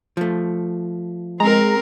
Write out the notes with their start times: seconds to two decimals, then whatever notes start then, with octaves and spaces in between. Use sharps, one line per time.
0.17 F3 A3
1.40 G#3 C4 A#4 A#5